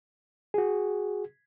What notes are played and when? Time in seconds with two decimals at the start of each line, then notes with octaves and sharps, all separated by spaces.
0.54 F#4 G#4